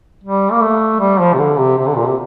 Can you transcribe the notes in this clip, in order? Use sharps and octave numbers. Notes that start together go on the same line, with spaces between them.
G3
A#3
A3
G3
F3
C3
D3
C3
C3
D3
A#2
C3